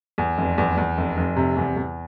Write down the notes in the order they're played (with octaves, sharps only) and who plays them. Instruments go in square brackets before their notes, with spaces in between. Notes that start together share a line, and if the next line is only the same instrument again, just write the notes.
[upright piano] E2
F1
E2
E2
F1
F1
C3
E2
E2